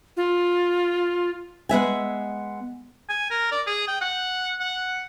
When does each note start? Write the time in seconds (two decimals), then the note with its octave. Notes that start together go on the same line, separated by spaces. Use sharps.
0.17 F4
1.69 G#3 B3 E5 G#5
3.09 G#5
3.30 A#4
3.51 D5
3.67 G#4
3.87 G5
4.01 F#5
4.60 F#5